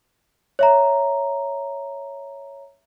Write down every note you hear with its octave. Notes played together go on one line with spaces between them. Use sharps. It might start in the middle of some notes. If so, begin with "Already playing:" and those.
C#5 E5 A#5